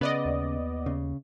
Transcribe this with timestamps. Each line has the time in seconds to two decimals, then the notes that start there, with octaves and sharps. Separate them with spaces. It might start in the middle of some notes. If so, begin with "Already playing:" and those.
0.01 C#3 B3 D5 D#5
0.25 D#2
0.86 C#3